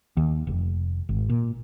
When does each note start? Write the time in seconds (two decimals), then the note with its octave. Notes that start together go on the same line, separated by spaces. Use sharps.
0.17 D#2
0.47 F1
1.09 G#1
1.30 A#2